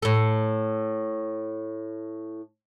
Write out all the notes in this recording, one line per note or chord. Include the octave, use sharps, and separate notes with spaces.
A2 A4